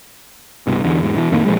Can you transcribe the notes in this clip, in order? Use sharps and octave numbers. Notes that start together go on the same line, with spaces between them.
C2 G2 B2
E2 D3
E2 G#2
B2 E3
F2 A2 D#3 A#3
A#2 D3 F3 G#3